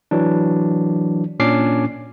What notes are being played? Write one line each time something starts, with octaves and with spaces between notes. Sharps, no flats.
E3 F#3 D4
A#2 C#4 D4 D6 C7